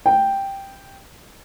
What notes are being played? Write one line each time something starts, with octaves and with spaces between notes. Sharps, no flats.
G5